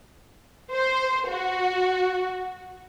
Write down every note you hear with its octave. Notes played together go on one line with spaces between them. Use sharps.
C5
F#4